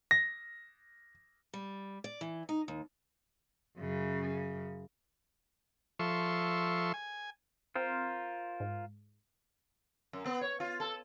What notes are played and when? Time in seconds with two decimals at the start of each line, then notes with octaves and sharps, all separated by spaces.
0.11 A#6
1.54 G3
2.04 D5
2.21 E3
2.49 D#4
2.68 D#2
3.78 F#2 C#3
5.99 F3 A4 E5 C6 C#6
6.94 G#5
7.76 C4 F4 A#4 C5
8.60 G#2
10.13 F#2
10.26 B3
10.41 C#5
10.60 F4
10.80 A4